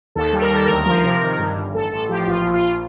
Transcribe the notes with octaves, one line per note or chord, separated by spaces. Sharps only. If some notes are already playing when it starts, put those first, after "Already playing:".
D#2 A4
G3
A#4
D#2 A4
D2 A#4
F3
C3
D#3
G2
G1
A1 A4
A1 A4
F3 G4
G4
A#1 F4
A#1
F4
A#1